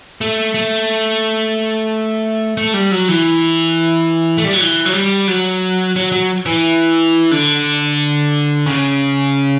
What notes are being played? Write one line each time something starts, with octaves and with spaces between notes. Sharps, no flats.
A3
A3
A3
G3
F#3
E3
A3
G3
F#3
E3
F#3
G3
F#3
F#3
F#3
E3
D3
C#3